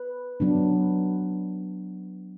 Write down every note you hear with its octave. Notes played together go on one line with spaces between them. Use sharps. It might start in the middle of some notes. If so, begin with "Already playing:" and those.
Already playing: B4
F#3 B3 D4